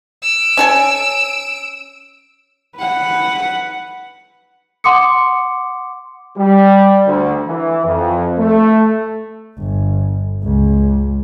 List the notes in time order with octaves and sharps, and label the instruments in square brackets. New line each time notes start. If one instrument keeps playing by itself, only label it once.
[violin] E6 D7
[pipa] C#4 A4 G#5
[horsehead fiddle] B4 F#5
[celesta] F#5 C6 D6 D#6 C#7
[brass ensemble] G3
D2
E3
F2
A3
[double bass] G1
C#2